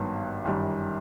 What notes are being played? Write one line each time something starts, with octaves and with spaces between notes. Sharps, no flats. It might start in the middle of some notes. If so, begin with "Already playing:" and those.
Already playing: G#1 G2 D#3 F#3 B3
G1 F#2 D#3 G3